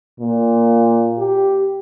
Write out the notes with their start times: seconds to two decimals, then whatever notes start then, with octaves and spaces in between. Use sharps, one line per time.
0.20 A#2
1.18 G4